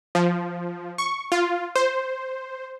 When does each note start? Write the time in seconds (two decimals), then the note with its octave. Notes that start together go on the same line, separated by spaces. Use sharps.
0.15 F3
0.98 C#6
1.32 F4
1.76 C5